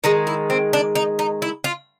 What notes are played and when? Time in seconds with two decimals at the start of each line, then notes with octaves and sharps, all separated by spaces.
0.04 D#3 G#3 D#4
0.27 E4
0.50 C4
0.73 D4
0.95 D#4
1.19 D#4
1.42 E4
1.64 F4